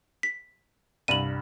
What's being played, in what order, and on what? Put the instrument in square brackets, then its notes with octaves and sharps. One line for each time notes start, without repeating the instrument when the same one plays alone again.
[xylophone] B6
[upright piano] C2 G2 E7 [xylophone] D#7 F#7